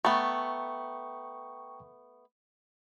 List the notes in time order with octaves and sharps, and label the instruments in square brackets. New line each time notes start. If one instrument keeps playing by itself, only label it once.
[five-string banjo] A3 B3 [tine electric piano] G5 A#5 C#6